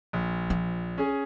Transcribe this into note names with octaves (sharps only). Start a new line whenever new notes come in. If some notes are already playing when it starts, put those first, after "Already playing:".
A#1
F3
C#4 G#4